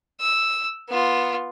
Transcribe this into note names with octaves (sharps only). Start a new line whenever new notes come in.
E6
B3 F4